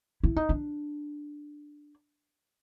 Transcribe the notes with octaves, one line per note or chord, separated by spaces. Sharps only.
E4
D#4
D4